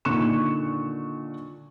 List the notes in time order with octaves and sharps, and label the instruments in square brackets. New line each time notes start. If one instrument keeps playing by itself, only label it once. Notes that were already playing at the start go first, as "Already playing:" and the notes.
[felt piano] A#2 D3 D#3 C#6 F#6 E7